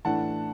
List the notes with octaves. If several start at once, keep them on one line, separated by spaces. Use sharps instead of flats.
A2 E3 A3 D4 F#5 A5